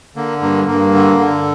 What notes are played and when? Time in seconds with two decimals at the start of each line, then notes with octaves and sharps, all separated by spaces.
0.16 D3 A#3
0.42 G2 A#3
0.68 G2 A#3
0.94 D3
1.20 D3